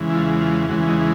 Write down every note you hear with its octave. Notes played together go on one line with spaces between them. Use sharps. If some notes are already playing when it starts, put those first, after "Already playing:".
Already playing: E2 C#3 E3 G#3
E4
F4
F4
E2 C#3 E3 G#3 F#4
D#4